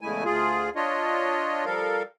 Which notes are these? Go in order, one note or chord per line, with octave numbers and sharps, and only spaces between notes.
E2 C#3 G#3 A3 E4 G#5
D2 F4 G#4
D4 F4 C#5 D#5
F3 G3 A4 A#4 F5